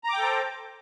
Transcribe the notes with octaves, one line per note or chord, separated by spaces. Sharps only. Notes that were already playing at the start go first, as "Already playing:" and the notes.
A4 C5 G5 A#5 D6